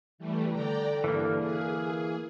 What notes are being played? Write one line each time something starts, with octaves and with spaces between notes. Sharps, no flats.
E3 G3 A3
D3 D5 G5 A#5
G2 E3 A#3
G#4